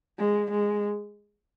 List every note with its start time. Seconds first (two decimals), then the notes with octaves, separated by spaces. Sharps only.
0.19 G#3
0.51 G#3